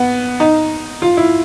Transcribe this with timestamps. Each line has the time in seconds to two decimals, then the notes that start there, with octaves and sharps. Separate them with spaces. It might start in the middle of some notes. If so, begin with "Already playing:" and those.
Already playing: B3
0.40 D#4
1.02 F4
1.17 E4